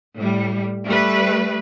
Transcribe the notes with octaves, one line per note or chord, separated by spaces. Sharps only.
A2 G3
G3 A3 B4